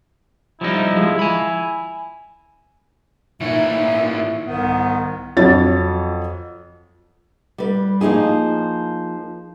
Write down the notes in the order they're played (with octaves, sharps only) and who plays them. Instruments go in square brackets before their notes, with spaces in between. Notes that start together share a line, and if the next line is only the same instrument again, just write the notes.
[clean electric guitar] F3 G3 D#4 [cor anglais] E4
[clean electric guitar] F3 G#3
G#5 B5
[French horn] A#2 [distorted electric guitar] E3 C#5 [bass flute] D#4 [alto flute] E5
[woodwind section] C2 G#2 D#3 B3
[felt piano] F2 F#3 C#5 A6
[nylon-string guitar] G3 B4
F3 A#3 D#4 G#4